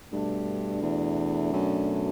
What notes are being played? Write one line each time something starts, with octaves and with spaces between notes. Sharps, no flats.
G2 B2 A3 D4
E2
F#2